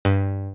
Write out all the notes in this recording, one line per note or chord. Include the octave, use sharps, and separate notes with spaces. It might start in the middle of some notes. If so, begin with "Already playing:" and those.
G2